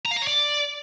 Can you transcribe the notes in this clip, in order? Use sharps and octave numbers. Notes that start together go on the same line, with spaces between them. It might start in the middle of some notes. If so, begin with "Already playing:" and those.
A#5
F5
A#5
C#5
D5